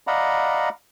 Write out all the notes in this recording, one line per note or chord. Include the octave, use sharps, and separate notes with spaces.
D5 D#5 F5 F#5 A#5 B5